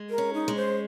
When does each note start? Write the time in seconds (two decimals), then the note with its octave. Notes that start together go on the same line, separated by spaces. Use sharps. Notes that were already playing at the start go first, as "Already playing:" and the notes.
Already playing: G#3
0.10 A#4
0.18 C#4
0.34 D#4
0.48 G#3
0.56 C5